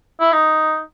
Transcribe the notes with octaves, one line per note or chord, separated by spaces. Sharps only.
E4
D#4